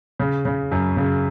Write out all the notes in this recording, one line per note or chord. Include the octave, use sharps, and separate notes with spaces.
C#3
C#3
F#2
C#3